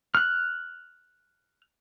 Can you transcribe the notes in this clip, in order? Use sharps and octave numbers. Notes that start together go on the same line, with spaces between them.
F6 F#6